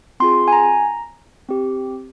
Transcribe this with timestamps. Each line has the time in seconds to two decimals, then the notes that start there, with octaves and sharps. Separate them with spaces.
0.20 C4 F4 G#4 C6
0.48 G#5
0.52 A#5
1.49 C4 G4